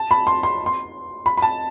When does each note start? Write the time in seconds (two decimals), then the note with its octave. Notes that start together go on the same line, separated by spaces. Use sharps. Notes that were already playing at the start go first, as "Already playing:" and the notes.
Already playing: A5
0.11 B5
0.27 C6
0.43 C6
0.66 C6
1.26 B5
1.37 B5
1.42 A5